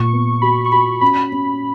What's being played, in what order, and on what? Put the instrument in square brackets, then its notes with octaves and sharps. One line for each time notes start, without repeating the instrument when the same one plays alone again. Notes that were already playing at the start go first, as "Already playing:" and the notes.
Already playing: [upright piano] A#2 [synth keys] C#6
[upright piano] B3
[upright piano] F#4 [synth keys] B5
[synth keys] C#6
[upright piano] F#4 [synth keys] B5
[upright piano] C#4 [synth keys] B5
[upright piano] C#4